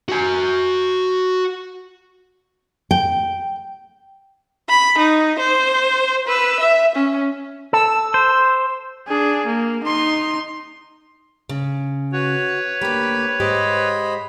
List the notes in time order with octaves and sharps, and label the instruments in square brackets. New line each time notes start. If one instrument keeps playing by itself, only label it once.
[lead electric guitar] F#4 G#5
[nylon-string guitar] G5
[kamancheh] B5
D#4
C5
B4 E6
E5
C#4
[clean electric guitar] A4 [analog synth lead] E6
[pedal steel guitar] C5
[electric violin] D4 G#4
A#3
D#4 C6
[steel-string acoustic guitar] C#3
[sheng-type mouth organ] F#4 [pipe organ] B4 C#5
[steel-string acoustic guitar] D2 A#3 [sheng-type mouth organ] G4 B5
[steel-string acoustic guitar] G#2 G4 [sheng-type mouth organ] C5 D#5 B5